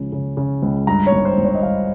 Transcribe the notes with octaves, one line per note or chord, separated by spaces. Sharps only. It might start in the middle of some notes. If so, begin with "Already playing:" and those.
Already playing: C#2 C#3 F3
C#3
C#3
C#2
G2 A#5
C#5
G#1
C5
G#1
C#5
D#5
G2 F5